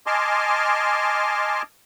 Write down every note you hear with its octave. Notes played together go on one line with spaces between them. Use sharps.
D#5 G#5 A5 C6 D6 F6